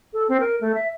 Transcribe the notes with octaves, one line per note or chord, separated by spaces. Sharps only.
A4
C4
A#4
A3
E5